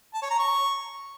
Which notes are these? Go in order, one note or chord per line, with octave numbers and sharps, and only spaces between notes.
A5
C#5
A#5
C#6